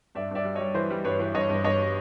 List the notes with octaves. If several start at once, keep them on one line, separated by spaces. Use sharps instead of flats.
G2 D5 E5
G2 D5 E5
G3
G3 C#5 D#5
E3 C5
G3
G2 B4 C#5
E3
G2 C#5 D#5
G2
G2 C#5 D#5